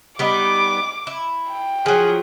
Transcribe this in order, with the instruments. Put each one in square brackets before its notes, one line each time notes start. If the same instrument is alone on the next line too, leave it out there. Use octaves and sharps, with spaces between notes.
[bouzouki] G3 B3 D#4 [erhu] D6
[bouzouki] E4
[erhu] G5
[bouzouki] F3 F#3 [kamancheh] G#4